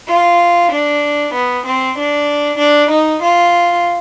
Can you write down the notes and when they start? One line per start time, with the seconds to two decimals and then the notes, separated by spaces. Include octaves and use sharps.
0.09 F4
0.72 D4
1.33 B3
1.65 C4
1.97 D4
2.58 D4
2.90 D#4
3.21 F4